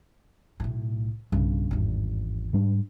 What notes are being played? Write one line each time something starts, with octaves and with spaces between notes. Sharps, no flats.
B1 A2
B1 G2 C#3
G#1 E2
G#2 G3 D4